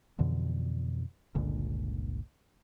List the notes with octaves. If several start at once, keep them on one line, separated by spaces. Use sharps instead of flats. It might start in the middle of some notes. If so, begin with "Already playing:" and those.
F2 B2 D3 E3
G1 C#2 A#2 D3